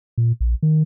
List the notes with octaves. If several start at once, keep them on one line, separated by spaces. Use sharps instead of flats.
A#2
A#1
D#3